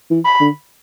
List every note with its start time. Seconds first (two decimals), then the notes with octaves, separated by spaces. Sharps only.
0.11 E3
0.25 B5
0.40 D3